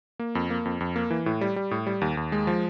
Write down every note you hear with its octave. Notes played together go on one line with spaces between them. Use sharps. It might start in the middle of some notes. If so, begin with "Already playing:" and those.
A#3
F2
A#3
F2
F2
A#3
E3
A2
G3
G3
A2
G3
D#2
D#2
G#3
F3